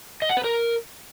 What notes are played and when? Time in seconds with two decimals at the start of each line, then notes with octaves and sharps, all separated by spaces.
0.22 D#5
0.29 F#5
0.37 B4
0.44 A#4